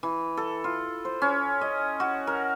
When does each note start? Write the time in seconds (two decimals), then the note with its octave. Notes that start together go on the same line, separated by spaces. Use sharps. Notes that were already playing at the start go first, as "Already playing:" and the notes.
0.03 E3
0.37 A4
0.64 F4
1.05 C5
1.22 C#4
1.61 D#5
2.00 F#4
2.27 A#4